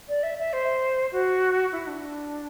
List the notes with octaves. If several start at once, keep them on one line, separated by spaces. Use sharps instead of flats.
D5
E5
E5
C5
F#4
E4
D4